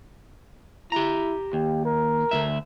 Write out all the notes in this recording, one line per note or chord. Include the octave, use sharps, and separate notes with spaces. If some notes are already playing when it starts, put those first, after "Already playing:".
E4 G4 A#5
D#2 G4
A#4
D2 G#2 E5